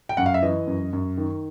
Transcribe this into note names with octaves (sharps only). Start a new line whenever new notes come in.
G5
F#2 F#5
F5
E5
E3 D#5
F#2
F#2
D#3